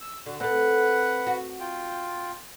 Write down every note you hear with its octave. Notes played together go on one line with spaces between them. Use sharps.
E6
D3 F#4
C4 A4 B4 F#5
F#4
F4 G5